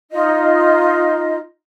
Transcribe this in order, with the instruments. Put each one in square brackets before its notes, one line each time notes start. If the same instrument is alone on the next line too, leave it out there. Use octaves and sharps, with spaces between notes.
[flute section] D#4 F4 D#5